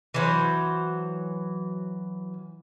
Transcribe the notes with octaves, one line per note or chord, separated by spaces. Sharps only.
E3 F#3 C5